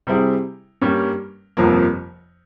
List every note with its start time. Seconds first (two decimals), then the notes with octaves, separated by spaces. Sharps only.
0.07 C3 G3 C4 E4 G#4
0.81 G2 G3 A#3 C#4
1.57 G1 F2 C3 F3 A#3